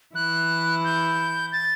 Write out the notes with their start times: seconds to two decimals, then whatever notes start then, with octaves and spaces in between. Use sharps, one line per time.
0.15 E3 E4 F#6
0.84 G6
1.53 A6